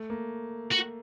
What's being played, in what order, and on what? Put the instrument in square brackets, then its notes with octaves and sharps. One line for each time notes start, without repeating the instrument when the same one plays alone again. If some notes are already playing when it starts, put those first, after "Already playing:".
Already playing: [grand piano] A3
A#3
[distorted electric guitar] F#4